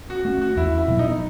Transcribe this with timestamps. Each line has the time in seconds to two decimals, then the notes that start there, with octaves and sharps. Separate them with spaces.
0.10 F#4
0.25 A3 C#4 F#4
0.42 F#4
0.56 E2 E4
0.78 E4
0.88 B2 F#3 B3
0.99 D#4